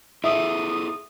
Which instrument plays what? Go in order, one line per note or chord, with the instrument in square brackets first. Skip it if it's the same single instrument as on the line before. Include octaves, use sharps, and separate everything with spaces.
[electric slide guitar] E4 G#4 A4 [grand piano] E5 [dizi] D#6